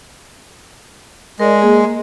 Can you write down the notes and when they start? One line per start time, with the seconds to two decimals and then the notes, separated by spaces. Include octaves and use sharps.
1.40 G#3 A#4 D5
1.62 A#3 G#4